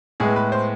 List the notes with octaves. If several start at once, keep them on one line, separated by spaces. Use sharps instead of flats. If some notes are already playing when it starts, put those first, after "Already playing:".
A2 G#3 B3 G#4
B4
C5